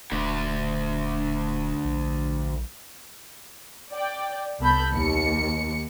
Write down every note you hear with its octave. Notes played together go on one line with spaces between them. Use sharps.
D#1 D2 D3
A#1
D5 G5
C2 B3 A4 B5 G6
D#2 C#7